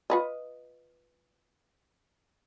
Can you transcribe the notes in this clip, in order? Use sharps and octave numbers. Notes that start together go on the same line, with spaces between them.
F4 B4 D#5